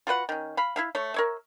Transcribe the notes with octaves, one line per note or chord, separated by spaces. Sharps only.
F4 F#4 B4 F#5
D#3 C#4
F5 B5
E4 E5 F5
A3 C#5
A#4 C#5 E5